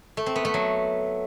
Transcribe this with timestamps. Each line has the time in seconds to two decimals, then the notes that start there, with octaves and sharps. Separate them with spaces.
0.17 A3
0.26 C4
0.36 B3
0.45 A3
0.54 F#3